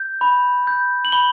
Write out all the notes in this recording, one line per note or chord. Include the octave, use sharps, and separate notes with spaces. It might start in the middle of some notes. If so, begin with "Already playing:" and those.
Already playing: G6
B5
G6
F#7
B5 G7